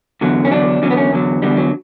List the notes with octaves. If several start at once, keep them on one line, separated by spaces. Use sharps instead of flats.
E2 D3 F#3
C#4
E2 D3 F#3 D4
E2 D3 F#3 C#4
B3
C#4
E2 D3 F#3
E2 D3 F#3 G3
F#3